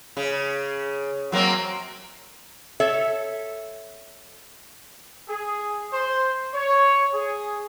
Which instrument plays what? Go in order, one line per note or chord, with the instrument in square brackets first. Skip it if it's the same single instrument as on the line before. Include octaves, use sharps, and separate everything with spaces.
[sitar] C#3
F#3 A#3 C4
[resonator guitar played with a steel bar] A4 C#5 E5
[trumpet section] G#4
C5
C#5
G#4